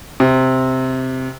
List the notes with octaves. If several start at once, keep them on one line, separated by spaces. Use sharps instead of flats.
C3